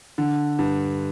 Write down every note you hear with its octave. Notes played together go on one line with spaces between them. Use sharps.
D3
G2